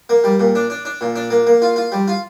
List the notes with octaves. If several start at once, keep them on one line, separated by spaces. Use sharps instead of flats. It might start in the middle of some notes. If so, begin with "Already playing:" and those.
A#3
G3
A#2
D4
D4
D4
A#2
D4
A#3
A#3
F4
F4
G3
F4